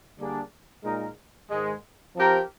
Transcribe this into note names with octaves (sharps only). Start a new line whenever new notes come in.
D3 G3 A#3 D4 G#4
A#2 G#3 D#4 A#4
G#2 D#3 G#3
F3 C4 G4 A#4